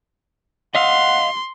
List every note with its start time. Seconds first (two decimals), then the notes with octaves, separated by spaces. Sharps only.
0.75 D#5 F5 F#5 C6